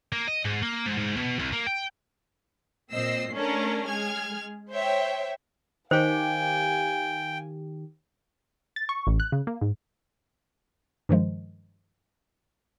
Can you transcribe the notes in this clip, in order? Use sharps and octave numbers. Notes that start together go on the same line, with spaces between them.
A#3
D#5
G#2
A#3
G#2
G#2
B2
C2
A#3
G5
A#2 C4 D#5 E6 C7
A3 C#4 D4 A4 A#4
G#3 G#4 F6 G#6
C5 C#5 E5 G5
D#3 G4 C5 F5 G5 G#5
A6
C#6
A1
F#6
C#3
A#3
G#2
G2 D#3 F3 G#3